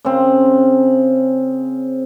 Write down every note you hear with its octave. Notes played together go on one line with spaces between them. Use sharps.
C#3 C4